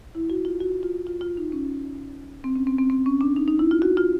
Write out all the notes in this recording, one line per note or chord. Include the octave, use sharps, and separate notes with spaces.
E4
F#4
F4
F#4
F4
F4
F4
D#4
C#4
C4
C#4
C4
C4
C4
C#4
D4
D#4
D#4
E4
F4
F#4
F4